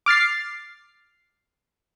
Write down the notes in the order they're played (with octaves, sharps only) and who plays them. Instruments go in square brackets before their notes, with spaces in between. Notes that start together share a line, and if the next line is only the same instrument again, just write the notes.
[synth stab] D6 F6 A6 C7